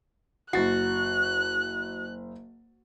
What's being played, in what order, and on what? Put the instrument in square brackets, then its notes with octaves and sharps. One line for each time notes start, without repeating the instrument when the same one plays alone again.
[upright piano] F#1 A6 C7 [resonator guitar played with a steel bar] F#4 [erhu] F#6